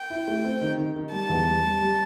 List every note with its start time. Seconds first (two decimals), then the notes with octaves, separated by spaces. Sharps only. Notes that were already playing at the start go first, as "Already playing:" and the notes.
Already playing: G5
0.10 E4
0.28 A3
0.44 C4
0.61 D#3
0.78 D#3
0.96 D#3
1.12 G3 A5
1.29 E2
1.47 G3
1.64 G3
1.81 G3